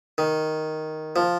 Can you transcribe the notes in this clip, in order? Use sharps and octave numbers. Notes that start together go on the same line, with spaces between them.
D#3
F3